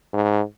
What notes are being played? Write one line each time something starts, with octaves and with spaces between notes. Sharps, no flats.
G#2